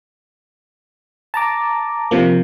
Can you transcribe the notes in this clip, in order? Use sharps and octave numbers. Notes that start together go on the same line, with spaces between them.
A5 A#5 D6
C3 F3 A#3